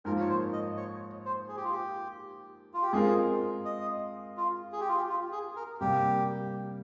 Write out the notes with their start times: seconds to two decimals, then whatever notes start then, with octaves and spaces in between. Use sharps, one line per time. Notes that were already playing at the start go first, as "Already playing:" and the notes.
0.05 G#2 F3 A#3 A#4
0.20 C#5
0.29 C5
0.53 D#5
0.77 C#5
1.25 C5
1.48 G#4
1.57 G4
1.64 F4
1.72 G4
2.74 F4
2.83 G4
2.92 G#3 C4 F4 G#4 A#4
3.65 D#5
4.37 F4
4.72 G#4
4.81 G4
4.88 F4
4.97 G4
5.09 F4
5.32 G#4
5.56 A#4
5.80 C3 G3 A#3 G4